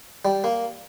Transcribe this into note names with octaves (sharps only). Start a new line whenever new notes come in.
G3
A#3